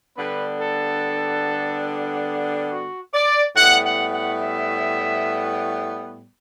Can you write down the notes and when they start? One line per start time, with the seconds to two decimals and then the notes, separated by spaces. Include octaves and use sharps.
0.18 D3 G3 B3 D4 B4
0.60 A4
2.72 F#4
3.14 D5
3.56 A2 G3 B3 F#5
3.85 F#5
4.13 F#5
4.41 E5